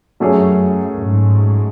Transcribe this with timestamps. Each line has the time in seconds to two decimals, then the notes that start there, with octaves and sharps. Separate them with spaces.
0.20 F#2 F#3 A3 C#4 G#4 C#5
1.02 G#2